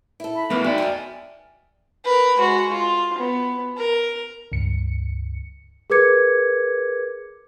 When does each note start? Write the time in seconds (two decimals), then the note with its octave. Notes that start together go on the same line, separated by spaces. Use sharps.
0.20 E4 A4
0.37 B5
0.50 A3 B3 E4 A#4 B4
0.64 D#3 F#4 D5 E5 G5 G#5
0.78 A4 D#5
2.05 A#4 B4
2.37 G#3 F#4
2.72 F4
3.18 B3
3.78 A#4
4.52 C#2 G2 C#7
5.90 G#4 A#4 B4 D6 G#6 C#7